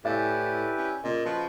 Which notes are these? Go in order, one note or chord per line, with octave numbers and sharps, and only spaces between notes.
A2 E4 G4 B4 D5 E5 G#5 A6
C#4
A#2 C#3 D#5
F3 F#4 B4